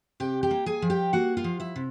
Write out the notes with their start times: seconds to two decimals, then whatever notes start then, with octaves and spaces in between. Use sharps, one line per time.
0.20 C3 G4 G5
0.43 G4 G5
0.51 A#3
0.66 G#4 G#5
0.82 F3
0.90 G4 G5
1.13 A#3 F#4 F#5
1.37 F4 F5
1.44 F3
1.60 E4 E5
1.76 C3